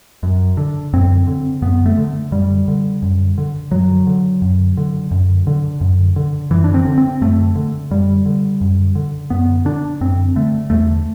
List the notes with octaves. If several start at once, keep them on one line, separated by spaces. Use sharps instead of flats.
F#2
D3
F#2 C4
D3
F#2 B3
A3
D3
F#2 G3
D3
F#2
D3
F#2 F#3
D3
F#2
D3
F#2
D3
F#2
D3
F#2 E3
D4
C4
D3
C4
F#2 A3
D3
F#2 G3
D3
F#2
D3
F#2 B3
D3 D4
F#2 C4
D3 A3
E2 A3